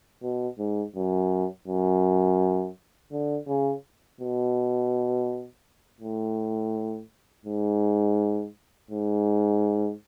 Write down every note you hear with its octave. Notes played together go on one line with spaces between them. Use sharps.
B2
G#2
F#2
F#2
D3
C#3
B2
A2
G#2
G#2